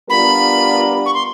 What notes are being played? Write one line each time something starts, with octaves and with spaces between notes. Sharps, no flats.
G3 B3 D4 F4 A#4 B5
C#6
C6